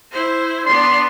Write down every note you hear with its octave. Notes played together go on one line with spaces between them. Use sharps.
E4 C5
B3 D4 C6